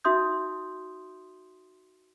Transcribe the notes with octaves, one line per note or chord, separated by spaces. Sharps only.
D#4 F#4 E5 C6 D#6 G6